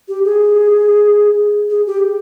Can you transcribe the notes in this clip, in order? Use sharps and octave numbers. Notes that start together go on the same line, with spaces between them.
G4
G#4
G#4
G4